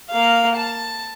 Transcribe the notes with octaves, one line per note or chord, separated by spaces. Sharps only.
A#3 F5
A5